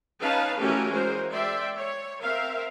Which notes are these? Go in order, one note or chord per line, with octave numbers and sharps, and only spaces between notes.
C#4 D#4 B4 F5 A5
E3 A3 C#4 F#4 G4 A#4
G#3 F#4 A#4 C5
D5 E5 G5 C6
C#5
C4 A#4 E5 F5